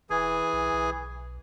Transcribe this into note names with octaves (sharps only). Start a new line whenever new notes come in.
E1 E3 G#4 G#5
B1
B1